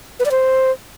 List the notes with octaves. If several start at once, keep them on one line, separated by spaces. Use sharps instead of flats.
B4
D5
C5